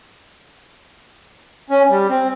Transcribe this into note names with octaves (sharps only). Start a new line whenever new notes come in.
C#4
G3
C4